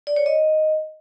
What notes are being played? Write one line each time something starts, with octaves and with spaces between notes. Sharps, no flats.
D5
C#5
D#5